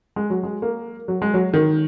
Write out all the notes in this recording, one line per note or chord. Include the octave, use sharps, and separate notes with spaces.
G#3
F#3
G#3
A#3
F#3
G#3
F#3
D#3